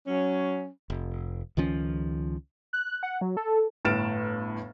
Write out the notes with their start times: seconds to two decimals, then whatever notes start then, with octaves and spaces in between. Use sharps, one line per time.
0.07 F#3 C#4
0.90 F1
1.57 C#2 D#3 F3 C#4
2.73 F#6
3.03 F#5
3.21 F#3
3.37 A4
3.85 G1 A2 F6 A6 D7 E7